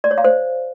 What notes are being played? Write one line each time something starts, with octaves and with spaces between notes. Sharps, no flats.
D5
C#5
F5
C5